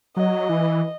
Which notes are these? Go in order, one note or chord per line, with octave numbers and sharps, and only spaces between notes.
F#3 D#5
E3